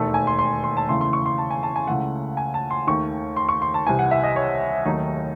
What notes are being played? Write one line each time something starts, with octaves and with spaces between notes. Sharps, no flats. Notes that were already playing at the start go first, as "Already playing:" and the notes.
Already playing: E1 D#2 D#3 A3 A4
G#5
C6
C6
C6
A5
E2 C#3 E3 A3 C6
C6
C#6
C6
A5
G#5
A5
G#5
C#2 C#3 E3 A3 F#5
G#5
A5
C6
D#2 D#3 A3 C#6
C6
C#6
C6
A5
C2 C3 E3 G#5
F#5
E5
D#5
C#5
D#2 D#3 F#3 A3 D#4